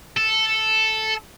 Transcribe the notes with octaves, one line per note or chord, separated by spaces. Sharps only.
A4